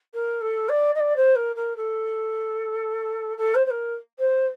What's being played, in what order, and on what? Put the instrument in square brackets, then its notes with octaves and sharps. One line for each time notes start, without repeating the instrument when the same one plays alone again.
[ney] A#4
A4
D5
D#5
D5
C5
A#4
A#4
A4
A4
C5
C5
A#4
C5